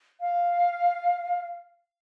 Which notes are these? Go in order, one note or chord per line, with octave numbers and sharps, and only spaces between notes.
F5